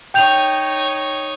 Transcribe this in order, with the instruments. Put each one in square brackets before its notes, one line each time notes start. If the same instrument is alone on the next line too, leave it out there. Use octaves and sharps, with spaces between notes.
[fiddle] D#4 C#5 [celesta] G5 G6 F7